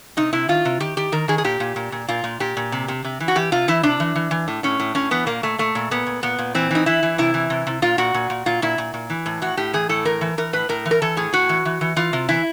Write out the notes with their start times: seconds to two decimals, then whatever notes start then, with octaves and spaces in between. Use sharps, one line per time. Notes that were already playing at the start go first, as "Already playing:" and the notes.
0.17 C3 D#4
0.33 C3 E4
0.49 D#3 F4
0.65 C3
0.80 D#3 G4
0.97 D#3 G4
1.12 D#3 A#4
1.28 D#3 G#4
1.38 G#4
1.44 A#2 G4
1.60 A#2
1.76 A#2
1.92 A#2
2.08 A#2 F4
2.24 A#2
2.40 A#2 G4
2.57 A#2
2.72 C3
2.88 C3
3.04 C3
3.20 E3
3.28 F#4
3.35 E3 G4
3.52 C3 F4
3.68 E3 E4
3.83 C3 D4
4.00 E3
4.15 E3
4.31 E3
4.48 A2
4.63 A2 C#4
4.80 A2
4.95 A2 C#4
5.11 E3 B3
5.27 A#2 A#3
5.43 A#2 A3
5.58 A#2 A3
5.75 A#2
5.91 A#2 B3
6.07 A#2
6.23 A#2 B3
6.39 A#2
6.55 E3 C4
6.71 E3 D#4
6.86 E3 E4
7.03 E3
7.18 C3 E4
7.34 E3
7.50 C3
7.67 C3
7.82 A#2 F4
7.98 A#2 F#4
8.14 A#2
8.30 A#2
8.46 A#2 F4
8.62 A#2 E4
8.78 A#2
8.94 A#2
9.10 E3
9.26 A2
9.42 A2 F#4
9.57 A2 G4
9.73 E3 G#4
9.89 A2 A4
10.05 E3 A#4
10.21 E3
10.38 E3 A#4
10.53 A2 B4
10.69 A2 A#4
10.86 E3
10.91 A#4
11.02 E3 A4
11.17 A2 G#4
11.33 A2 F#4
11.49 E3
11.65 E3
11.81 E3
11.96 E3 F4
12.13 C3
12.29 E3 E4